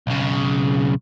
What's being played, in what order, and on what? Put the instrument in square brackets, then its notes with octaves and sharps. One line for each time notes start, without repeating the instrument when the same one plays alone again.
[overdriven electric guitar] B1 C#3